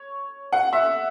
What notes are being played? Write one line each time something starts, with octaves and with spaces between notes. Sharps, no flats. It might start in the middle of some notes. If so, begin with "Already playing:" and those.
Already playing: C#5
F#5
E5